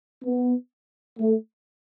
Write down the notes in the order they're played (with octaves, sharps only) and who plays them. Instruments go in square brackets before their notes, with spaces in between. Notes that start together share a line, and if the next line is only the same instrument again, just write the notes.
[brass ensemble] B3
A3